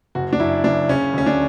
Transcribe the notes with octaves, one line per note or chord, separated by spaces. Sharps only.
F#1 F#4
D4
F#2 E4
F#1 D4
C#3 C#4
D2 C#4
D4